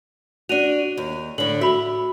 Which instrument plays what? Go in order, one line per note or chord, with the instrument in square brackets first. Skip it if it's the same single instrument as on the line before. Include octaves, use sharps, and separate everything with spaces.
[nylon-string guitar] D4 F#4 [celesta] D#7 F7
[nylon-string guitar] D#2
[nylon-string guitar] A2 D3 [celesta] F#7
[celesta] F#4 B5 [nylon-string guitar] E5